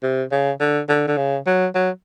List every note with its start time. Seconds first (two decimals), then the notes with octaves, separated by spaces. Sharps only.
0.03 C3
0.32 C#3
0.60 D3
0.89 D3
1.08 D3
1.18 C#3
1.46 F#3
1.75 F#3